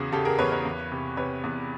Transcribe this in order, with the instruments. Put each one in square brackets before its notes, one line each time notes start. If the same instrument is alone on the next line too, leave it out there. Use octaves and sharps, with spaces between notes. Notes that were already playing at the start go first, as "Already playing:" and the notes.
Already playing: [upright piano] E2 C#3 F#4 G#4
C#3 G4 A4
G#4 A#4
E2 B4 C#5
B4 C#5
E2
C3
C3 B4 C#5
E2